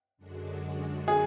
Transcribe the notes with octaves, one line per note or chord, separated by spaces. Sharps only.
F#2 D3 G#3 D4 F#4
G#4